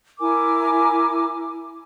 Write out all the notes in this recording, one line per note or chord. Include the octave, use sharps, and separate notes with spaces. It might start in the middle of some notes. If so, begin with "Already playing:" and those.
E4 A#4 G#5 D6